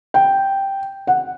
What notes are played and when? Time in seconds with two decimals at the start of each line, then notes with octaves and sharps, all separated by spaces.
0.14 G5
1.07 F#5